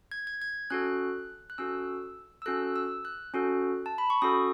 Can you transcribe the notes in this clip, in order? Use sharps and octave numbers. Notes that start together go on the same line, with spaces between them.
G#6
G#6
G#6
C#4 F#4 A4 F#6
F#6
C#4 F#4 A4 E6
E6
C#4 F#4 A4 F#6
E6
F#6
C#4 F#4 A4
A5
B5
C#6
C#4 F#4 A4 D#6